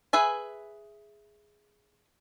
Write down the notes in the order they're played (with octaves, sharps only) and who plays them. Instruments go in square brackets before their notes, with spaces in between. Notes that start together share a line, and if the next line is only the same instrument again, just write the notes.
[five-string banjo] G#4 B4 E5 G#5